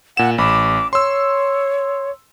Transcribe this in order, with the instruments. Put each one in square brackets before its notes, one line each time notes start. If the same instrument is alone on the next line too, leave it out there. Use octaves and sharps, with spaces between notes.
[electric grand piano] A#2 E7 [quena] F#5
[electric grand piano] A1 B5 [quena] D6
[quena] C#5 [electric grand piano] C6 E6